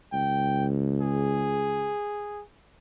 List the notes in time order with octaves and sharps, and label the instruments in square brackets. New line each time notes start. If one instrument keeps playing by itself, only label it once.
[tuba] C#2 [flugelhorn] G5
[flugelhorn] G#4